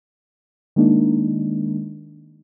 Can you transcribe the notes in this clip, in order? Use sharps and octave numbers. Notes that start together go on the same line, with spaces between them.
D#3 G#3 A#3 D4 D#4